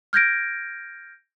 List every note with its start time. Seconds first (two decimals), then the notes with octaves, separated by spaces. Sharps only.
0.13 F6 G6 G#6 A#6 D7